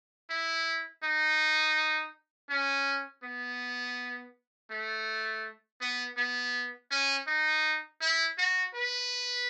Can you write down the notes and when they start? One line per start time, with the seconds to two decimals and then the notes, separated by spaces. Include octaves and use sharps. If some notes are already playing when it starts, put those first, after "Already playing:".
0.30 E4
1.03 D#4
2.50 C#4
3.23 B3
4.71 A3
5.81 B3
6.17 B3
6.91 C#4
7.27 D#4
8.01 E4
8.38 F#4
8.75 B4